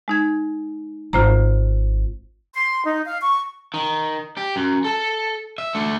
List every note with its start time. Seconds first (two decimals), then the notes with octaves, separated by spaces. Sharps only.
0.08 G#3 D#4 G#6
1.13 G#1 F4 C5 A#5
2.55 C6
2.84 D#4
3.05 F5
3.20 C#6
3.74 D#3
4.37 G4
4.56 F#2
4.84 A4 A5
5.58 E5
5.75 A3 D4